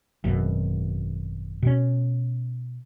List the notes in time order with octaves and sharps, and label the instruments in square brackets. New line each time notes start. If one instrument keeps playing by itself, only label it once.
[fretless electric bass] G#1 F#2 B2
B2 C#4